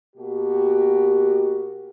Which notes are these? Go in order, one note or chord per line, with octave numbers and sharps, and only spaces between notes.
B2 A#3 F#4 G4